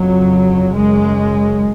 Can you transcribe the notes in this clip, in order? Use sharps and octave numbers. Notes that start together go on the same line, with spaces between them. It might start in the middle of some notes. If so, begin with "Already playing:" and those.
Already playing: F2 C#3 F#3
F#2 C#3 G#3